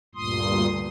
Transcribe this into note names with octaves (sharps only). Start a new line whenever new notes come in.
D2 G2 A#2 C6 D#6